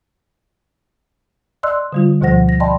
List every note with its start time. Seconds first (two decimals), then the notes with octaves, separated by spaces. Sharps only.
1.63 D5 D#5 C6 E6 F#6
1.93 D3 G3 F4
2.21 D2 B2 F3 C5 F#5 A#6
2.49 A#6
2.60 D5 D#5 G5 A5 B5 C6